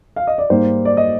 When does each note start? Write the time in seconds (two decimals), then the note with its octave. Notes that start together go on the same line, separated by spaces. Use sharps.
0.16 F5
0.27 D#5
0.38 D5
0.50 G#2 G3 A#3 C5
0.85 D5
0.97 D#5